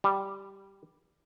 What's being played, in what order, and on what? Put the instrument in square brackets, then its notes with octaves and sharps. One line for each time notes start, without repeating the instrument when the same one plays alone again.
[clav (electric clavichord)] G3